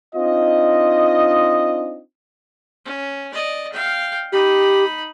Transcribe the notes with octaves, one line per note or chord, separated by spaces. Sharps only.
C4 D4 D#4 F4 D#5
C#4
D5 D#5
F5 G5
D#4 G4 B5